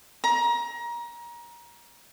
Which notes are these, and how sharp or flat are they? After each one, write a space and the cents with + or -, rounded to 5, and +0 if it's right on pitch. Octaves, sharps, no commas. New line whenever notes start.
A#5 +25